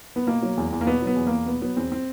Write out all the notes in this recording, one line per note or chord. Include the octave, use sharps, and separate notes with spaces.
B3
B2 A#3
F#3
E2
E2
A#3
B2 B3
F#3
B3
E2
A#3
E2
B2 B3
F#3 B3
E2 C4
C4